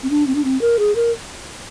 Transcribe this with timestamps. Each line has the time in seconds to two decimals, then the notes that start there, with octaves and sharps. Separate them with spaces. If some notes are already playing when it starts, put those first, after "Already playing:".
0.03 C4
0.10 D4
0.27 C4
0.35 D4
0.44 C4
0.61 A#4
0.79 G#4
0.96 A#4